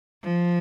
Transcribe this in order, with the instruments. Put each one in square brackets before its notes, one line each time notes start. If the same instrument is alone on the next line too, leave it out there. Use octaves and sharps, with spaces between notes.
[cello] F3